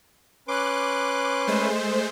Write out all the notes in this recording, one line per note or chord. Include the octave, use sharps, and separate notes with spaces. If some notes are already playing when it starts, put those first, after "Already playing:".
C#4 B4 C6 D6 F#6
G#3 A3 C5